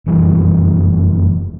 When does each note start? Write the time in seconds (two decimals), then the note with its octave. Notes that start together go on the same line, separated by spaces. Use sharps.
0.06 F1 F#2 E3 G3